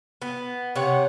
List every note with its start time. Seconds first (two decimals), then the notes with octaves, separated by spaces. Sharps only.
0.22 B3
0.76 C3 C#5 F#5